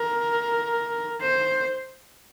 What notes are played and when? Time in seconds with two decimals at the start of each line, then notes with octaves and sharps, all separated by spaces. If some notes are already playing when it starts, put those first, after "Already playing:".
Already playing: A#4
1.21 C5